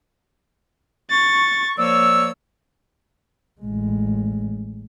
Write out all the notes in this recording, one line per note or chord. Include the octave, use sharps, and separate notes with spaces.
C#6 A6
F3 A#3 C#5 D5 E6
A1 G#3